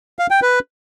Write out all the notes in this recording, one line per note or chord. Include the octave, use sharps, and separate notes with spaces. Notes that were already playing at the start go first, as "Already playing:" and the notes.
F5
G5
B4